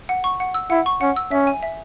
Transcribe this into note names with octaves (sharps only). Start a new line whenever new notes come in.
F#5
C#6
F#5
E6
E4 F#5
C#6
C#4 F#5
E6
C#4 E5
G#5
E5